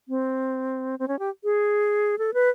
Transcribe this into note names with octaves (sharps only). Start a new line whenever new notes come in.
C4
C4
C#4
G4
G#4
A4
B4